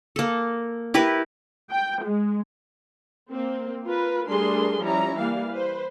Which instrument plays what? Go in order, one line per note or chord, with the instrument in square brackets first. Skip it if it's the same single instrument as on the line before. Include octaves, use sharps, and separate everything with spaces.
[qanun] A#3 A4
E4 G4 A#4 B4
[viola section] G5
G#3
A#3 C4
F4 A#4 B4
G3 A3 D4 G#4 A#4 C6
F3 G3 C#4 E4 A#5
E3 G3 A#3 F5
B4 C5